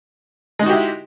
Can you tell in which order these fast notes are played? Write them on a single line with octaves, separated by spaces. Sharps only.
G#3 D#4 F#4 G4 E4